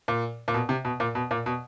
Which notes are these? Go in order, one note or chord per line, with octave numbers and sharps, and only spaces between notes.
A#2
A#2
B2
C3
B2
A#2
B2
A#2
B2